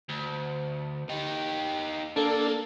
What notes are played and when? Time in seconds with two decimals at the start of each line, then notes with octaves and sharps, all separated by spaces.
0.09 D2
1.09 D#4 G4
2.16 A#3 D4 A4